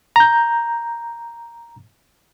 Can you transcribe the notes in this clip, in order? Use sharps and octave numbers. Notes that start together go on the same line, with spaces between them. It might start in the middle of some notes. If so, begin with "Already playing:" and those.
A#5 G6